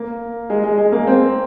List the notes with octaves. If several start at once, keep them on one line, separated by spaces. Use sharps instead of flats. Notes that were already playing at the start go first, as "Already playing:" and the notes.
Already playing: A#3
G#3
G#3
G#3
A#3
C4